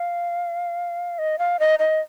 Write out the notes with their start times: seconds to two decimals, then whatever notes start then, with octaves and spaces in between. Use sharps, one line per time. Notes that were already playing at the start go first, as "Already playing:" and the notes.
Already playing: F5
1.18 D#5
1.39 F5
1.59 D#5
1.79 D#5